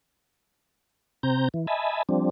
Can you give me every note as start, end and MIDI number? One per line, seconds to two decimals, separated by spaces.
1.23 1.48 48
1.23 1.48 60
1.23 1.48 82
1.23 1.48 91
1.54 1.66 52
1.67 2.03 75
1.67 2.03 76
1.67 2.03 80
1.67 2.03 81
1.67 2.03 83
2.09 2.30 53
2.09 2.30 55
2.09 2.30 60
2.09 2.30 62